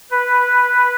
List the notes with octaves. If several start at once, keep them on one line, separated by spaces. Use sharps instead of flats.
B4